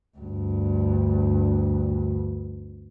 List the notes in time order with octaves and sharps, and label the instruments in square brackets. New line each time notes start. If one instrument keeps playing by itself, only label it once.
[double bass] D2 G2